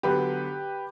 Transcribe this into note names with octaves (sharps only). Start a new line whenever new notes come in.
D3 F#3 B3 G4 B4